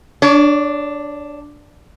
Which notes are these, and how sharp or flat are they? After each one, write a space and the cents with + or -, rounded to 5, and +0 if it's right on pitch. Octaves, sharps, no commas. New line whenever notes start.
D4 +0 C#5 +30